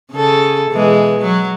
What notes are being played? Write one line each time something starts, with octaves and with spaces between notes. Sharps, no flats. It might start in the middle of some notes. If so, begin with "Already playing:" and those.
C#3 A4
B2 E3 G#3
F#3